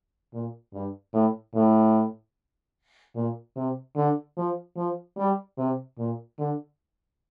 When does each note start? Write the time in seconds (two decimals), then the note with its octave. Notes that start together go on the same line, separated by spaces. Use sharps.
0.33 A#2
0.73 G2
1.13 A2
1.54 A2
3.15 A#2
3.56 C3
3.96 D3
4.37 F3
4.77 F3
5.18 G3
5.58 C3
5.98 A#2
6.38 D3